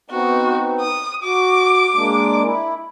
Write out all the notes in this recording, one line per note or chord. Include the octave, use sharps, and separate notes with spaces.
B3 C4 D#4 F#4
D#6
F#4 D6
G#3 A#3 D4
E4